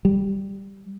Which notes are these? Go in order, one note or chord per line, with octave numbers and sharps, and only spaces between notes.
G3